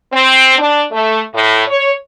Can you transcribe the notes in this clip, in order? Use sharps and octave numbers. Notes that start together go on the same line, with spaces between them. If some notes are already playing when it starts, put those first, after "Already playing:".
C4
D4
A3
A2
C#5